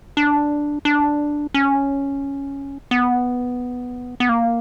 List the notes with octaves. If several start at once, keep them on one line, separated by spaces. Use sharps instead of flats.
D4
D4
C#4
B3
B3
A#3